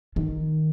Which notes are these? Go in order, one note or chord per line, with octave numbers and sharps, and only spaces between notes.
D#3